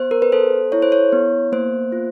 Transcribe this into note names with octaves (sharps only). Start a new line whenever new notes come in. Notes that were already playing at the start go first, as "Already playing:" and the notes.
Already playing: B3 C5
A#4
B4
A4 C5
E4 C#5
C5
C#5
B3
A#3 C5
F4